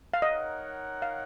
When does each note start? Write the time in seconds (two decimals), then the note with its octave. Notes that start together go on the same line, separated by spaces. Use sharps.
0.14 F5
0.22 D#4 A#4 C#5 D#5 F#5
1.02 F5